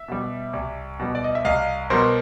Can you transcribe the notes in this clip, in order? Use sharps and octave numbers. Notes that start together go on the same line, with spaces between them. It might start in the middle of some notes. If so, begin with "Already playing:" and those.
Already playing: E5
B2 G3
C2
B2 G3
D5
D#5
E5
C2 D#5 F5
B2 G3 A#4 C5